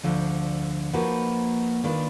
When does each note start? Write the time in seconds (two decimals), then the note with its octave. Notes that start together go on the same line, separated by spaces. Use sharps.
0.03 D2 D3 F3
0.93 F3 A#3 D#4 F#4 B4
1.84 D#3 A#3 D4 F4 B4